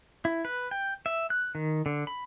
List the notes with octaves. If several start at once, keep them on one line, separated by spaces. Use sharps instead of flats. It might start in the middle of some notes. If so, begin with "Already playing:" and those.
E4
B4
G5
E5
F#6
D#3
D3
B5